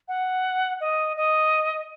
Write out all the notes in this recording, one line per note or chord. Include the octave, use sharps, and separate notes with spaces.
F#5
D#5
D#5